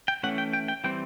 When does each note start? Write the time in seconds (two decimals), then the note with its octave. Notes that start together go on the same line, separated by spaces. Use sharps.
0.08 G5
0.23 E3 A3 C#4 F#5
0.38 G5
0.53 G5
0.68 G5
0.84 E3 G3 C4 G5